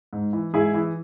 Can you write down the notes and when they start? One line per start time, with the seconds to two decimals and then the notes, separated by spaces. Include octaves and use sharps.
0.13 G#2
0.33 E3
0.53 G#2 E4 G#4
0.74 E3